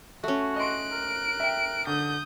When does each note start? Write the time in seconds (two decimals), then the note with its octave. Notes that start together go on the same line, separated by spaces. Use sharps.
0.24 A3 C#4 F#4
0.56 D#5 C6 F#6 D7
0.92 A#4
1.40 E5 G5
1.87 D3 D#6 G6